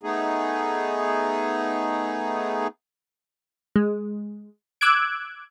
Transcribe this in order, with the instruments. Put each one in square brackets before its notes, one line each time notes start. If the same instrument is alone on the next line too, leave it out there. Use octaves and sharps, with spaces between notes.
[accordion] A3 B3 D#4 G#4
[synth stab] G#3
D6 E6 F#6 G#6 D7